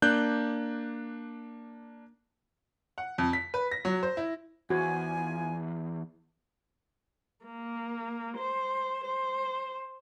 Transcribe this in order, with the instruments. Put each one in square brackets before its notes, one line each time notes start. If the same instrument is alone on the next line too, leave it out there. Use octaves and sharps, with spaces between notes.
[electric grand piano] A#3 D4 F#6 G6
[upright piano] F#5
F2
B6
B4
A#6
F#3
C5
E4
[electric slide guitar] E2 [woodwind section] F3 G#5 [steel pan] F#4
[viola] A#3
C5
C5